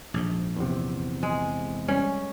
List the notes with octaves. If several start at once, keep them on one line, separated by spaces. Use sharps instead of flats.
A#1 G#2
E2 C3
G#3
G3 C#4